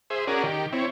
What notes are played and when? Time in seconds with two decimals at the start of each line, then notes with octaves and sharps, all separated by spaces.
0.10 G#4 C5 E5
0.27 C#4 F#4 G#4 A#4 D5
0.44 D#3 G4
0.72 C4 E4 C#5